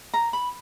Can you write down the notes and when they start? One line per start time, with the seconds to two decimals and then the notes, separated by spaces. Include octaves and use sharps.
0.14 A#5
0.33 B5